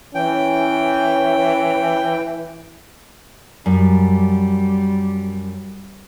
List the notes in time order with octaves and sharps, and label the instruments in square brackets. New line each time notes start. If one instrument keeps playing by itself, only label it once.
[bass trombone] E3 [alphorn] C#4 [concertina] G5
[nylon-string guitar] F#2 [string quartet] G3